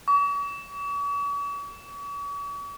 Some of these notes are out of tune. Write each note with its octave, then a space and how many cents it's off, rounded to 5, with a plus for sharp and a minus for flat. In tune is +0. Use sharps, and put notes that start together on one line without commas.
C#6 +45